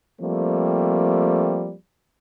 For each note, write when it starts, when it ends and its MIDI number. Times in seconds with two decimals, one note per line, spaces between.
0.21 1.73 53
0.21 1.73 55
0.21 1.73 57
0.21 1.73 58
0.21 1.73 60